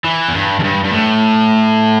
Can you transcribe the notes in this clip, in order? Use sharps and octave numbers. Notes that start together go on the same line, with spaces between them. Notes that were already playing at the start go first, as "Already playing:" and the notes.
E3
E2
G2
E2
G2
G2
A2